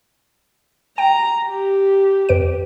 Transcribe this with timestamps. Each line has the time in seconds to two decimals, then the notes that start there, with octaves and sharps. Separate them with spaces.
0.98 G5 A#5
1.49 G4
2.29 F2 B4 D7